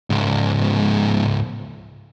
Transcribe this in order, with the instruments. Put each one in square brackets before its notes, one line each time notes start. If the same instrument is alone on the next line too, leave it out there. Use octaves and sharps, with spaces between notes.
[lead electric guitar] C#2 G#2